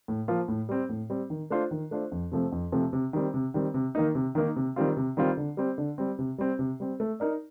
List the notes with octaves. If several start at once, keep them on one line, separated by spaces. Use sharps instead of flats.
A2
F3 A#3 F4
A2
G3 C4
A2
G3 C4
D#3
A3 D4 F4 C5
D#3
A3 D4 F4 C5
F2
C3 F3 A3 C4
F2
C3 F3 A3 C4
C3
D#3 G3 C4
C3
D#3 G3 C4
C3
D#3 A#3 D#4
C3
D#3 A#3 D#4
C3
D#3 G3 C4 F4
C3
D#3 G3 C4 F4
D3
G3 C4
D3
G3 C4
C3
G3 C4
C3
G3 C4
A3
D#4 A#4 D5